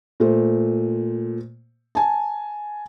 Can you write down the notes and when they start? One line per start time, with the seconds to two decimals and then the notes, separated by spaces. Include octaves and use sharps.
0.20 A#2 A3 C5
1.95 G#5 A5